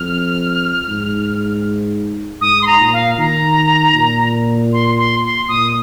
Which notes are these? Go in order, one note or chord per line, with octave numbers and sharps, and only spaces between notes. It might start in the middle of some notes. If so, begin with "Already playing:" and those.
Already playing: F2 F6
G#2
G#2 D#6
C6
A#5
A#2
F5
D#3 A#5
A#2
C6
C6
C6
A#2 D#6